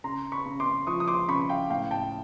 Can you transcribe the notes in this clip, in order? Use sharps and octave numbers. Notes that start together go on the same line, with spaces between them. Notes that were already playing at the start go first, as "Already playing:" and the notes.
C#3 A#5 C6
B5 C#6
C#3
C6 D6
F3 C#6 D#6
D#6
C6 D6
C#3 B5 C#6
F5 G5
A2 F5 G5
G5 A5